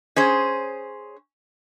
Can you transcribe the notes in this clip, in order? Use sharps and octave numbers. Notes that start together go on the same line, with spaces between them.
C#4 G#4 C5